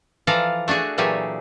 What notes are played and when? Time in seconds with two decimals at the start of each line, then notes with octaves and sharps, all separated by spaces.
0.27 E3 F3 A4 D5 F5 A#5
0.68 A3 D4 F#4 G#4
0.98 A#2 E3 F#3 A3 G4 G#4